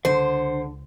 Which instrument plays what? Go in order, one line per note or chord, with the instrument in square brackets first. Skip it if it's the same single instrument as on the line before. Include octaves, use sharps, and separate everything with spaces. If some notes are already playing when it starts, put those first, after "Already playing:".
[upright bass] C#2 [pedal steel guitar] D3 [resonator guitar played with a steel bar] C5